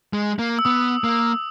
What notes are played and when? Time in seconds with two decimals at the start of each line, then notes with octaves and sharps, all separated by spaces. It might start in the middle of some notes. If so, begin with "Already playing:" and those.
0.13 G#3
0.39 A#3
0.59 E6
0.65 B3 D#6
1.04 A#3